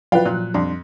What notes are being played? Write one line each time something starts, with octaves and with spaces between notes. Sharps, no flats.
F3 F#3 F4 B4 D5 F5 G5
A#2 F#6
F2 G3 D4 C6